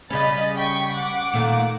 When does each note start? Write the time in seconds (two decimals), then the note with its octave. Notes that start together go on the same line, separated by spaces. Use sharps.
0.10 C#3 G3 C#4 D#5 B5 A6
0.56 G5 C#6 B6
0.93 F#5 D6
1.34 A#2 D#3 A3